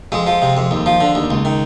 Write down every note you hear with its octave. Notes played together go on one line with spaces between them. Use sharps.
F2 G#3
F3
C3
F2
D#2
F3
D3
D#2
C#2
D#3